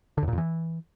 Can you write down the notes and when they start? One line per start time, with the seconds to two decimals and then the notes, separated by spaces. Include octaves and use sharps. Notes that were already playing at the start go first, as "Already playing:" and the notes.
0.18 D3
0.23 E2
0.28 A#2
0.33 F2
0.38 E3